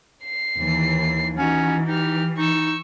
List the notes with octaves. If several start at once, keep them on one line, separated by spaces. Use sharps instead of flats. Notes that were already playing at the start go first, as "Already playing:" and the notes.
C7
D#2 E3
E3 C#4 D#4 F#4
D#4 G4 F6
D#4 C#6 E6